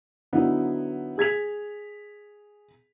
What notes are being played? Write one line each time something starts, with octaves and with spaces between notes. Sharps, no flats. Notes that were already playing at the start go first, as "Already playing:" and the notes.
D3 F#3 B3 D#4 E4
G#4 G#6 B6 F7